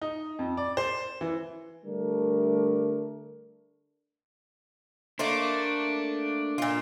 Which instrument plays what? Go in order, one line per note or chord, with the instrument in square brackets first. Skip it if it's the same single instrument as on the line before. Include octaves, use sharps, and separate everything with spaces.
[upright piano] D#4
F2
D5
C5
E3
[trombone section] D3 G3 A3 D4 A#4
[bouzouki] A3 A#3 C5 [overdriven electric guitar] D4
[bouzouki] A#2 F4